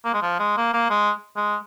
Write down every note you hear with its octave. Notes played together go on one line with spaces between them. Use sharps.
A#3
G#3
F3
G#3
A#3
A#3
G#3
G#3